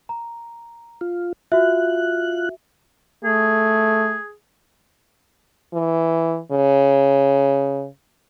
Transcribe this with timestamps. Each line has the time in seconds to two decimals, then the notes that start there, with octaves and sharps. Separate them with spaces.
0.09 A#5
1.01 F4
1.52 F4 F#4 E5 F#6
3.24 A3 G#4
5.73 E3
6.51 C#3